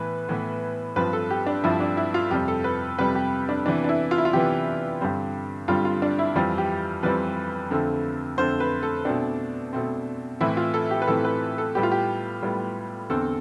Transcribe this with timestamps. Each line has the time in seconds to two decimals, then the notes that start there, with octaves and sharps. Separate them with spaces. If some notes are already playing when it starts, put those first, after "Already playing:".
Already playing: A2 E3 B3 B4
0.29 A2 E3 B3
0.96 G2 F3 C4 B4
1.13 A4
1.30 G4
1.47 D4
1.64 G2 F3 C4 E4
1.80 D4
1.97 E4
2.14 F4
2.31 F2 C3 G3 G4
2.48 A4
2.64 B4
2.99 F2 C3 G3 B4
3.15 G4
3.49 D4
3.66 C3 E3 B3 D4
3.84 D4
3.89 E4
4.11 F4
4.18 E4
4.25 F4
4.33 C3 E3 B3 G4
5.01 G2 D3 G3 C4
5.68 G2 D3 G3 C4 F4
5.85 F4
6.02 D4
6.19 E4
6.36 F2 E3 G3 C4 F4
6.58 G4
7.03 F2 E3 G3 C4 B4
7.70 F2 D3 A3 C4
8.38 F2 D3 A3 C4 C5
8.60 B4
8.83 A4
9.05 B2 A3 C4 D4
9.73 B2 A3 C4
10.40 A2 E3 A3 C4 E4
10.57 F4
10.74 A4
10.91 G4
11.02 B4
11.07 A2 E3 A3 C4 A4
11.25 B4
11.58 A4
11.75 A2 G3 B3 G4
11.83 F4
11.91 G4
12.43 A2 G3 B3
13.09 E2 D3 A3 C4 A4